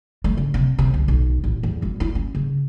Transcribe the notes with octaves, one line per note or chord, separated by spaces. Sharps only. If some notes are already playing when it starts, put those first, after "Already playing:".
A3
C#3
C3
C3
C#2
B1
A1
E2
G#1
E4
C#4
C#3